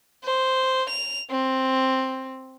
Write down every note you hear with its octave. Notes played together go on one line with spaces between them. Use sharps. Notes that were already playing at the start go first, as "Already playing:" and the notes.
C5
F7
C4